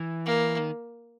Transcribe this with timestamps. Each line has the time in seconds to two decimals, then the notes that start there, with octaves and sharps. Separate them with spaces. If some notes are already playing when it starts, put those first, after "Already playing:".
Already playing: E3
0.26 A#3
0.58 D#3